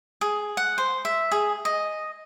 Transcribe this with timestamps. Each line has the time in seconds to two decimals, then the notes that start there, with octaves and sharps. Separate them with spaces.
0.21 G#4
0.57 F#5
0.78 C5
1.05 E5
1.32 G#4
1.65 D#5